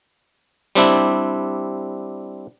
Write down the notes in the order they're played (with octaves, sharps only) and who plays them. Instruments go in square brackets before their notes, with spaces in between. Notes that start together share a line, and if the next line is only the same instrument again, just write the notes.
[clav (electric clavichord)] G3 C4 D4 E4